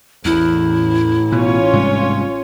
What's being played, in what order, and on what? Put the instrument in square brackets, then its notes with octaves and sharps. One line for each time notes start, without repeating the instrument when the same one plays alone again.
[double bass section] A1 [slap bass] E2 [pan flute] E4
[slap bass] B2 [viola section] C#4 F4 C#5
[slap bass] G#2 C3 G3